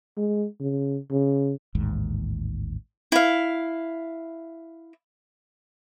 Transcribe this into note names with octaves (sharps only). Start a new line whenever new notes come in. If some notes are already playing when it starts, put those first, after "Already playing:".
G#3
C#3
C#3
A1 D#2 G#2
E4 F5